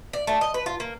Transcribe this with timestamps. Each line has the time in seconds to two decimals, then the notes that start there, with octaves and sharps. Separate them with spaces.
0.13 D5
0.27 A3
0.41 D#5
0.54 B4
0.66 F4
0.80 A#3